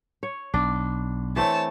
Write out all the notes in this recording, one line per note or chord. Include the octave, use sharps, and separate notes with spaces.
C#5
B1 D4
E3 A3 C4 C#5 A5